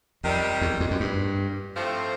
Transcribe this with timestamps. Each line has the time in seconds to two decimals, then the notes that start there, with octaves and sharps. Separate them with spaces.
0.24 F2 C3 D#3 G3
0.61 E2
0.80 F2
0.91 F#2
1.00 G2
1.76 A2 F3 A3 C4